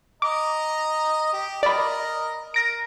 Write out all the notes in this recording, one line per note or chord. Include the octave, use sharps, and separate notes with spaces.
D#5 A#5 D6
G4
A#4 D5 D#5 B5
A#4 A#6 D7